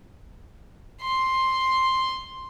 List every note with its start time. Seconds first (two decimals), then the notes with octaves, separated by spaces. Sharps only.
1.02 C6